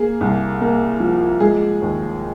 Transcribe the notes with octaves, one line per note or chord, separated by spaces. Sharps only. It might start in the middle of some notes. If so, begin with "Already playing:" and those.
Already playing: A#3 G#4
C2
A#3
F3
G#3 G#4
D#2